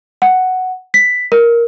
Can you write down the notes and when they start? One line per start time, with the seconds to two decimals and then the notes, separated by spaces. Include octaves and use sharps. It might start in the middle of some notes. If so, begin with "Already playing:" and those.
0.22 F#5
0.94 B6
1.32 A#4